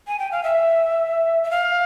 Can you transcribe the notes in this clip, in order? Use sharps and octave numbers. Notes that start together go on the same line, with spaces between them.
G#5
G5
F5
E5
E5
F5